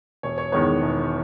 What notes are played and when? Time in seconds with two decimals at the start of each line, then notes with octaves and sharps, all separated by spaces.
0.23 E1 C#5
0.38 C#5
0.52 E2 D#3 G#3 B3 C#5
0.82 E1